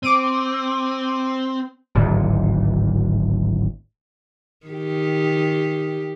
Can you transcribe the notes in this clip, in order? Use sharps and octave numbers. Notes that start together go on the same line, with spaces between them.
C4 D6 D7 D#7
D1 G#1 D2
D#3 G4